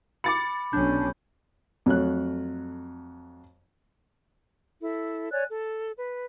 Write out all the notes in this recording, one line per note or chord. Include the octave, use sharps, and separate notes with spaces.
B5 D6 A6 C#7
B1 C#4 D4 G6
F2 F#3 A3 F#6
E4 A4
C#5 D5 G#5 F#6
A4
B4